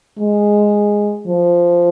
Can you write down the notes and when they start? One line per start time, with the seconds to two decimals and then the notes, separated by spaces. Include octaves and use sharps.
0.19 G#3
1.27 F3